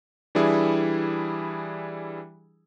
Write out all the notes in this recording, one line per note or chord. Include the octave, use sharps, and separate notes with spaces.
E3 G3 D4 E4 G#4